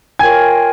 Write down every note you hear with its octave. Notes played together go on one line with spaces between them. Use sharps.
F4 A#4 C#5 G5 G#5 G#6